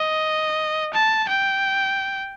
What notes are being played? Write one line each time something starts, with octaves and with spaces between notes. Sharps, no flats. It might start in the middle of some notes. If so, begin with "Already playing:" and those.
Already playing: D#5
A5
G5